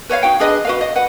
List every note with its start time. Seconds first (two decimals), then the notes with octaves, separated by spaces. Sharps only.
0.09 B4 C#5 E5 F5
0.23 D#4 F#4 G5
0.40 D4 G#4 B4 D#5
0.65 F#4 B4 F5
0.81 D#5
0.96 B4 F#5